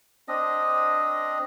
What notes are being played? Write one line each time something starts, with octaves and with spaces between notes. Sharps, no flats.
C4 D4 D#5